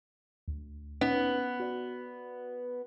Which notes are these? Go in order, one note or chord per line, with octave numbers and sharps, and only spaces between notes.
D2
B3 C#4 D#4 C#5
F#4 D5